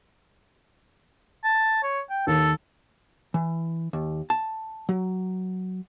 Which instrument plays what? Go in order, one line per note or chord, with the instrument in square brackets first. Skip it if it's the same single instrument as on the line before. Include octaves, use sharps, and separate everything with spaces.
[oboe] A5
C#5
G5
[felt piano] D#2 [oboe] A4
[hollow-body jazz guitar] E3
D#2
A5
F#3